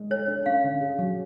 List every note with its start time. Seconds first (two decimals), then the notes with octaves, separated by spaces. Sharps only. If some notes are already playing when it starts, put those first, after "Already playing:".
Already playing: G#3
0.11 A4 C#5
0.28 D4
0.46 C#4 F5
0.64 D3
0.81 G#4
0.99 F#3